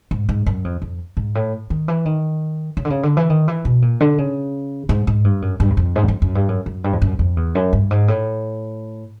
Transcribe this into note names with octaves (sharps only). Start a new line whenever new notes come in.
G#2
G#2
F#2
F2
F2
G#2
A2
D#3
E3
D#3
C#3
D3
C#3
D3
E3
D#3
E3
B2
A#2
D3
C#3
G#2
G#2
G2
F#2
G2
E2
F2
G#2
E2
F2
F#2
G2
F#2
F#2
G2
F2
F#2
F2
E2
F#2
G2
G#2
A2